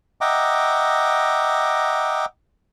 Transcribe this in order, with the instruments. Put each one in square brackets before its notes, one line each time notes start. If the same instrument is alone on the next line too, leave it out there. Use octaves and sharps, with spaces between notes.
[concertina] D#5 E5 F#5 G5 A#5 D6